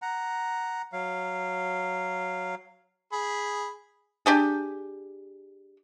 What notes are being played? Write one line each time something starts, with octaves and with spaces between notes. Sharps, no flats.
F#5 A#5
F#3 F5
G#4 B5
D4 G4 G#4